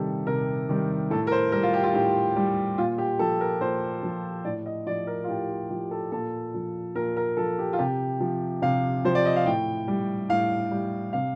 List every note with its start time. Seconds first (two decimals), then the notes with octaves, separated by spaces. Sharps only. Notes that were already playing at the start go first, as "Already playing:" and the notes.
Already playing: C3 D#3 G3 G4 A4
0.27 C3 A#4
0.69 D#3 G3
1.10 A2 A4
1.27 A#4
1.32 C5
1.52 G3 A#4
1.63 F4
1.73 G4
1.84 F4
1.94 A2 G4
2.36 G3
2.78 A#2 F4
2.98 G4
3.19 F3 A4
3.41 A#4
3.61 A#2 C5
4.03 F3
4.45 A2 D5
4.66 D#5
4.86 F3 D5
5.07 A#4
5.24 F4
5.28 A2 G4
5.50 F4
5.70 F3 G4
5.91 A4
6.12 A#2 A4
6.54 F3
6.95 A#2 A#4
7.17 A#4
7.37 F3 A4
7.59 G4
7.73 F4
7.79 C3 G4
8.20 F3
8.62 C3 F5
9.05 F3 C5
9.15 D5
9.25 D#5
9.36 F5
9.46 A2 G5
9.88 G3
10.29 A2 F5
10.71 G3
11.13 C3 F5